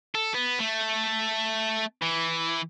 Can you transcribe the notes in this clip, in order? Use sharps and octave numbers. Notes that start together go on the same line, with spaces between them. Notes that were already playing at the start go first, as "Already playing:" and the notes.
A4
B3
A3
E3